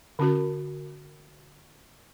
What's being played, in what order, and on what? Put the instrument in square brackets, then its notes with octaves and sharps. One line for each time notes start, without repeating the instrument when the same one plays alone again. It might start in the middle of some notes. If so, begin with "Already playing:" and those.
[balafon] D3 C#4 F#4 A#4